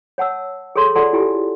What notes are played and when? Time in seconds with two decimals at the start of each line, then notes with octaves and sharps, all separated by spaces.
0.18 C#5 F#5 A5 E6
0.76 G#4 A4 C#5 C6
0.96 F4 A4 D5 F#5 A5 C6
1.13 E4 F4 G4 G#5